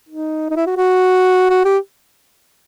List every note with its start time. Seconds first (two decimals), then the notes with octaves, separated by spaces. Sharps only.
0.09 D#4
0.50 D#4
0.56 E4
0.66 F#4
0.77 F#4
1.50 F#4
1.65 G4